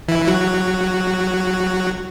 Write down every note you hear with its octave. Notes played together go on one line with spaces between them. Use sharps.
E3 E4
F#3 F#4